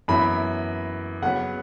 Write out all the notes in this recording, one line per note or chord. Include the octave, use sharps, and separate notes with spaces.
F#2 E3 B3 E4 B5
C#3 F#3 B3 F#5